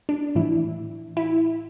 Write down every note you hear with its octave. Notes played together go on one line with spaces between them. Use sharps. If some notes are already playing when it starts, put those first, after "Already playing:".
D4
A2 E3 E4
E4